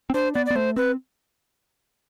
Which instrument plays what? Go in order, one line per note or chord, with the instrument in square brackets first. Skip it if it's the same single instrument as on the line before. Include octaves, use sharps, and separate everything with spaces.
[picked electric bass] C4
[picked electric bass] D4 [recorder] C5
[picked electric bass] B3 [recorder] D5
[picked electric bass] B3 [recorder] D5
[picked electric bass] A3 [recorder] C5
[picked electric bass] C4 [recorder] B4